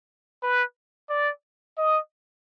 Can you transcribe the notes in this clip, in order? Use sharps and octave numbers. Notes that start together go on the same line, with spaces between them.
B4
D5
D#5